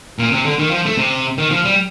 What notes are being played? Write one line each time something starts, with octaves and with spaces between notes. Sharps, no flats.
A#2
C3
D3
D#3
F3
A3
C3
D#3
F3
G3